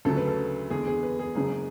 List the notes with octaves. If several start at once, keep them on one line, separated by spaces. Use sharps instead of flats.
D2 C#3 F#3 A4
B4
A4
E2 D3 G#3 G#4
G#4
B4
G#4
F#1 F#2 C#3 G#3 G#4